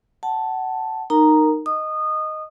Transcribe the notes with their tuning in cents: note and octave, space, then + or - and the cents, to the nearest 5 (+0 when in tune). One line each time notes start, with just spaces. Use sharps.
F#5 +20 A5 +0
D#4 -15 A#4 -10 A#5 +0
D#5 +0 D#6 -20